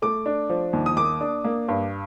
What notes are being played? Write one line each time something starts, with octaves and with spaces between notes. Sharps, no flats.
A3 D6
D4
F3
D#2
D#6
A#3 D6
D4
A#3
G2